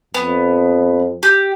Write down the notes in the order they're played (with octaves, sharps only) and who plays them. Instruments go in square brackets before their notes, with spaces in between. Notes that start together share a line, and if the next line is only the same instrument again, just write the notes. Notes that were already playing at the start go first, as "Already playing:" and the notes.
[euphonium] F2 [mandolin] B3
[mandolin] G4